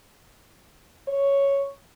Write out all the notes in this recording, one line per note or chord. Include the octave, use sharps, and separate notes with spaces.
C#5